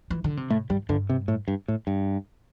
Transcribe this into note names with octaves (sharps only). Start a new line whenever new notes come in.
E3
D3
C3
A2 A3
G2 G3
G2 D3
C3
A2
G2
A2
G2